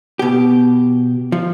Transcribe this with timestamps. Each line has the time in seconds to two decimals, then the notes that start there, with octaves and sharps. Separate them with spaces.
0.19 B2 G4
1.32 F3